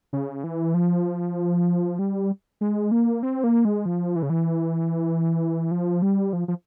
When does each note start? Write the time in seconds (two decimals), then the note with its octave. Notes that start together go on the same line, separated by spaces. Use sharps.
0.13 C#3
0.44 E3
0.74 F3
1.99 G3
2.61 G#3
2.91 A#3
3.23 C4
3.44 A#3
3.65 G#3
3.86 F3
4.16 E3
4.23 C#3
4.30 E3
5.71 F3
6.02 G3
6.33 F3
6.48 F3